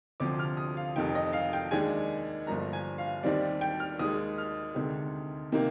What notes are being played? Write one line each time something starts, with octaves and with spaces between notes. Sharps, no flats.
D2 C3 F3 D6
F6
D#6
F5
F1 F2 D#3 G5
D#5
F5
G5
D#2 D#3 G#3 D4 G#5
G1 G2 F3 A#3 A#5
G#5
F5
D#2 D#3 G3 C4 D5
G5
F6
D#2 D#3 G#3 D#6
F6
D2 C3 D#3 G#3
C3 D#3 A#3